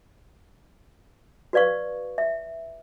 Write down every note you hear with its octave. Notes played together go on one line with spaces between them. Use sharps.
F#4 B4 D5 F5 C#6
E5